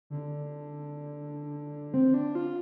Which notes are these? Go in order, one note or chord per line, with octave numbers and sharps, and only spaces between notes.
D3
C4
D4
F4